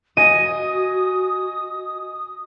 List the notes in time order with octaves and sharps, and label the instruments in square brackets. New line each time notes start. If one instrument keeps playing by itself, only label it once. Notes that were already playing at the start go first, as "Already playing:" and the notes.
[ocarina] F#4 [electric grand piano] D#5 G#5 A#6 [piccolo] D#6 [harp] D#7